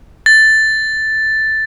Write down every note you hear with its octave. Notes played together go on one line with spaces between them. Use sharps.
A6